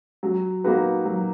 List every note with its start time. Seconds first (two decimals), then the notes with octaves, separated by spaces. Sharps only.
0.23 F#3
0.64 A#3 D#4 F#4 B4
1.05 F#3